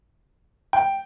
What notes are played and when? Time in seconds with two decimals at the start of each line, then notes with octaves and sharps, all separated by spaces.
0.73 G5